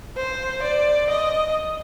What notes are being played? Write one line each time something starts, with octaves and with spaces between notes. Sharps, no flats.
C5
D5
D#5